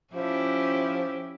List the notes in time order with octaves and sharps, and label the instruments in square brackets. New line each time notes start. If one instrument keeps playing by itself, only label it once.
[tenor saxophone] F3 [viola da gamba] C#4 E4 G4